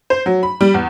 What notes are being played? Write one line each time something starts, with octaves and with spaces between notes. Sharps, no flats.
C5
F#3
B5
G3
E2